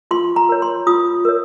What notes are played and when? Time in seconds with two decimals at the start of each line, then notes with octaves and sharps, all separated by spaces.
0.11 F4 C6
0.36 A#5
0.49 A#4 C#5
0.62 C6
0.87 F4 D#6
1.25 A#4 C#5